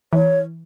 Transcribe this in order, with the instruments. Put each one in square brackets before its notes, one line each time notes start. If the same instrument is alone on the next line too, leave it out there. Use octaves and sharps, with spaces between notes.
[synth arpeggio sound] E3 [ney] C#5